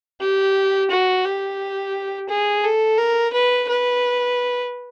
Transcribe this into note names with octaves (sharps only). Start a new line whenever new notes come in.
G4
F#4
G4
G#4
A4
A#4
B4
B4